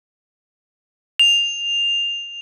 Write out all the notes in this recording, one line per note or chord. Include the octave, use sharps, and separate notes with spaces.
F7